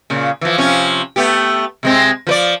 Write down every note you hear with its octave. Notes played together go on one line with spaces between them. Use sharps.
A#2 C#3
E3 F3
C3 F3 C#4
A3 B3 G4
C3 G#3 C4
F3 B4 D5